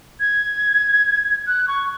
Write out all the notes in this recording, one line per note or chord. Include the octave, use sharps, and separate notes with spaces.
G#6
F#6
C#6